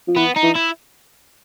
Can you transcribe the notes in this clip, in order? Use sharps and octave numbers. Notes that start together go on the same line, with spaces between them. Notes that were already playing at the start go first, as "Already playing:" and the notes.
F3
E3 B3
D#4
E3
E4